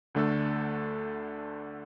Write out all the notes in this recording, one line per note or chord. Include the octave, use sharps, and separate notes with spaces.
D2 D3 A3 D4 A4